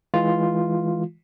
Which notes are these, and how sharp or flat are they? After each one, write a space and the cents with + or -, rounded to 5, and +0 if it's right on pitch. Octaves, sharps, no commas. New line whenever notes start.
E3 -15 G#3 +0 F4 +0